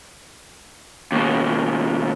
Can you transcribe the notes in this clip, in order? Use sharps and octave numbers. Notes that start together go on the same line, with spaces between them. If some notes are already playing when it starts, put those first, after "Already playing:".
D#2 B2